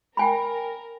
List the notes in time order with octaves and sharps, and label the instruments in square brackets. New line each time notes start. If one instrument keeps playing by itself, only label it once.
[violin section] A#4 [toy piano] G5 G#5 B5